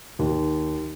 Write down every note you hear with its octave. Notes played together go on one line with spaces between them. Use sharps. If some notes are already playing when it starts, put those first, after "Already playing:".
D#2